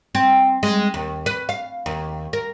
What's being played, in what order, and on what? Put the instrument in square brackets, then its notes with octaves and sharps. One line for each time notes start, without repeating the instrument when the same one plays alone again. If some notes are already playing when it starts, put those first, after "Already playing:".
[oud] C4
G#3
D#2
B4
F5
D#2
A#4